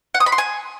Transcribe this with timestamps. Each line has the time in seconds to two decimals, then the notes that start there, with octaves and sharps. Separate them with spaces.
0.14 F#5
0.20 D#6
0.26 B5
0.32 C6
0.38 G#5